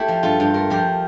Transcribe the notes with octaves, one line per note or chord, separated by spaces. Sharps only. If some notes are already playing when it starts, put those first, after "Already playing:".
Already playing: A3 E4 G4
F3
G2 F4 A4
G2
A3 A#4
F3 G4 A#4